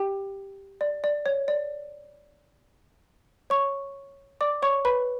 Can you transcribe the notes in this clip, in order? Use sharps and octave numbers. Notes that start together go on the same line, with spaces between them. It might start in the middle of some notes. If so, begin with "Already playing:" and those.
Already playing: G4 G5
D5
D5
C#5
D5
C#5 C#6
D5 D6
C#5 C#6
B4 B5